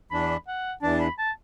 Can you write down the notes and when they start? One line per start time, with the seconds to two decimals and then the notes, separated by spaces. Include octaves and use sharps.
0.11 E2 E3 D4 B5
0.48 F#5
0.82 E2 E3 D4 A5
1.00 B5
1.18 A5